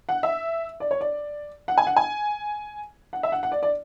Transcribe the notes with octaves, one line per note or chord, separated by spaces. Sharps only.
F#5
E5
D5
C#5
D5
F#5
G#5
F#5
G#5
F#5
E5
F#5
F#5
D5
D5